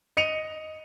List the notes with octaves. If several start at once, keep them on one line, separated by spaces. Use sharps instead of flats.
D#5 C#7 D#7 F7